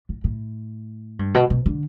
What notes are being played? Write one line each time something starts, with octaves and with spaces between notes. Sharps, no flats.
A2
A2
G2
B2
B2
D3